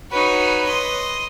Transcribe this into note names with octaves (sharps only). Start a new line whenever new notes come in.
D#4 F#4 B4 C#5
D#5 C6